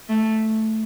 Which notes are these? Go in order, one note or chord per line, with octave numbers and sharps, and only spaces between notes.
A3